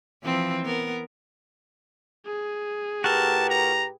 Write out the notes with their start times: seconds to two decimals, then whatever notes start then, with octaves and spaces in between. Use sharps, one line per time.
0.23 E3 F3 C4
0.65 B3 A#4
2.26 G#4
3.04 A2 F#4 G4 A#4 B4 A5
3.50 A#5